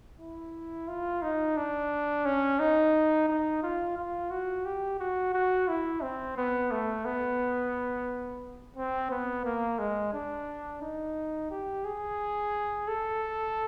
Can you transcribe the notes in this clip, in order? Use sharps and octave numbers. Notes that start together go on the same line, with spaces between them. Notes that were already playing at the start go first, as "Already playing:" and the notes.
E4
F4
D#4
D4
C#4
D#4
D#4
F4
F4
F#4
G4
F#4
F#4
E4
C4
B3
A3
B3
C4
B3
A#3
G#3
D4
D#4
G4
G#4
A4